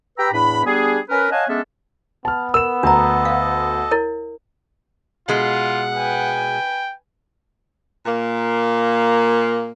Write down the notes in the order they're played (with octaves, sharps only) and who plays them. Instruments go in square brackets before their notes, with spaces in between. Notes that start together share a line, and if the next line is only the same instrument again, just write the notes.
[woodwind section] G4 B4 G5 A#5 B5 E6
E2 A2 D4 B5
G3 B3 D4 G#4
C#4 A#4 B4
C#5 D#5 F5 F#5 G#5 A5
G#3 B3 C#4 D4 A4 E5
[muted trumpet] B3 [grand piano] A5 F6
[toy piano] A#4 [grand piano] E6 E7
[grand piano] D2 [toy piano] D4 A#5 [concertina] A4 D#5 A5
[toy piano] F5
E4 A#4 C#5
[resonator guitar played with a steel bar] B2 G#3 [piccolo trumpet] F4 [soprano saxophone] F#5
[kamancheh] B4 G#5 [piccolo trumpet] G5
[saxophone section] A#2 A#3